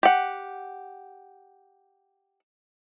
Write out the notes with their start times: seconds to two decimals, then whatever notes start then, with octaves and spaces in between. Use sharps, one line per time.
0.03 G4 F#5